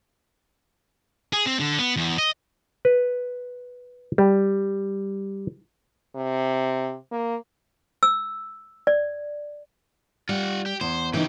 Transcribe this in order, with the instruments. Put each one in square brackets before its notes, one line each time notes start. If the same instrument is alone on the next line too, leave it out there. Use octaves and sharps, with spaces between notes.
[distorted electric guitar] G#4
C4
D3
B3
E2
D#5
[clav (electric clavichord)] B4
G3
[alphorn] C3
A#3
[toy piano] E6
D5
[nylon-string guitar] G3 [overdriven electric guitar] F4 F#5
[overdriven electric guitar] G4
[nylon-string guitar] E2 [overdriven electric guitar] C5
[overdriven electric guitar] C#3 G4 [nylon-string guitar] E3 D#4